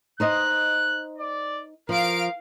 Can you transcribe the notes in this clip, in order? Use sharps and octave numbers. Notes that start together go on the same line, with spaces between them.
D#4 C5 D#5 F#6
D5
F3 A#4 F5 D7